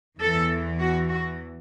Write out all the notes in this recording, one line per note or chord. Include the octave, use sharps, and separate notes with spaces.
E2 E3 A4
F#4
F#4